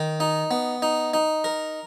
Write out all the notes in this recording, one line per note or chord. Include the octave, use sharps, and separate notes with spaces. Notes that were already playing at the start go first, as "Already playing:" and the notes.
Already playing: D#3
D#4
B3
D#4
D#4
A#4